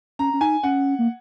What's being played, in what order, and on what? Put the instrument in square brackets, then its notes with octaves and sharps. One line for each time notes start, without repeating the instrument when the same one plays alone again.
[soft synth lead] C#4 [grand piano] A#5
[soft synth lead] C#4
[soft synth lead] D#4 [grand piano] G#5
[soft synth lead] C#4 [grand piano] F#5
[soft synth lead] A#3